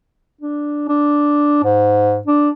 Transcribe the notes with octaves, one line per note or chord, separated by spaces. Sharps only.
D4
D4
G#2
D4